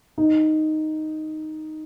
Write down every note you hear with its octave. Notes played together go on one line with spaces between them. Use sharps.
D#4